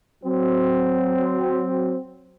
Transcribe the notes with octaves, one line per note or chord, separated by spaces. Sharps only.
F#3 C4